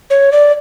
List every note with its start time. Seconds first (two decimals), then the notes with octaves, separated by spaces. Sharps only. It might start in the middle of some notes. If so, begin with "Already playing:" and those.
0.10 C#5
0.32 D5